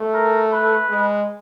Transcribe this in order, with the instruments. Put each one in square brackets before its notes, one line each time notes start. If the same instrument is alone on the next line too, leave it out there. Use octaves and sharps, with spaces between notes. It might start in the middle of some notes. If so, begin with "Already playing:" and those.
Already playing: [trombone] A3
[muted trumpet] A#4
B4
[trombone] G#3